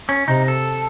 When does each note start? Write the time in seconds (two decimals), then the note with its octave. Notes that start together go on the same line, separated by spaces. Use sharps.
0.09 C#4
0.28 C3 D#4
0.48 A4